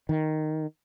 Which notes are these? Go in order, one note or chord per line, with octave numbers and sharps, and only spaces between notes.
D#3